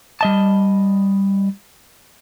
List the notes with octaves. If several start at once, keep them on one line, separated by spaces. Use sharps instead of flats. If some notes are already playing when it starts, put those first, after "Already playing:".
G3 D#5 A5